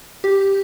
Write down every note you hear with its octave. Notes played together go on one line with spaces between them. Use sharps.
G4